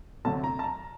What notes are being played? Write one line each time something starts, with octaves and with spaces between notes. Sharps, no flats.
D2 C3 F#3 A3 A5
A#5
A5
A#5